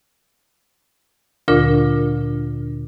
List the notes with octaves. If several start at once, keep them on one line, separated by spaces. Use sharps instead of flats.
D2 A#2 D3 D4 F4 A#4